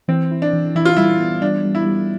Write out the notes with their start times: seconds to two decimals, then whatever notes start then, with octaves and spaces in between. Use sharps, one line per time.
0.08 E3 C4
0.31 E4
0.42 D4
0.53 E3
0.75 E3 E4
0.85 F4
0.97 G3 E4
1.19 B3
1.42 G3 D4
1.64 G3
1.75 E4
1.86 G3